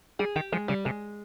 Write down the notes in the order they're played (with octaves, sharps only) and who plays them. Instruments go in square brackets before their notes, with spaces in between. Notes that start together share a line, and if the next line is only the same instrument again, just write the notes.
[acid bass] G3 [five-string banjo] G#4
[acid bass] D#3 [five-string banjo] G4
[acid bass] F3 [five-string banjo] G#3
[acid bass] C#3 [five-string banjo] G3
[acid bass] C3 [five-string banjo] G#3